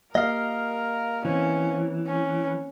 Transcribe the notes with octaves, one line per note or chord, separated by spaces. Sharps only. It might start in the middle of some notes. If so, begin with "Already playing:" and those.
A#3 G4 A#4 D#5 F5
E3 C4 C#4
C#4